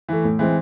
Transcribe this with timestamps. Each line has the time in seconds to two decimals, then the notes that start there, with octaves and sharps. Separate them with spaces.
0.09 E3 A3
0.24 A2
0.39 E3 G#3 C4